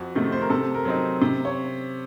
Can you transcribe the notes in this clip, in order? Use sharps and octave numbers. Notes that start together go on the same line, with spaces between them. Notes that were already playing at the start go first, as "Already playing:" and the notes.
Already playing: F2 F#4
C3 D#3 A3
C5
A#4
C3 A4
A#4
F#3 C4 D#4
C3
C#5